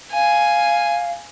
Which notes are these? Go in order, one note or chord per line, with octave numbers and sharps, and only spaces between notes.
F5 G#5